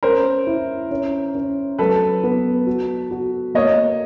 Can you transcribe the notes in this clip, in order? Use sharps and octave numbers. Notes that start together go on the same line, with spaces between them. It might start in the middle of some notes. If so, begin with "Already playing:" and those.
C#4 A#4 C5
E4
C#4
C#4
F#3 A4 B4
B3
F#4
F#4
A#3 C#5 D#5